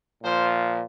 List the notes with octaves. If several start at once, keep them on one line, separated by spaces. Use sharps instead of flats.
A#2 F3 C5